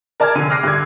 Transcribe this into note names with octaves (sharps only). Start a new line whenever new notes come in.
A#4 D5 A5 A#5 F6 G#6
F1 D3 D#7
D6 F6 F#6 A#6 C7
G2 D3 F6 G#6